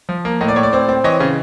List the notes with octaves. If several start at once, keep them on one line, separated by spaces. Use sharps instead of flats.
F3
A#3
A2 D#5
D5
A2 C#5
D5
C4
C4
E3 C#5 D#5
C#3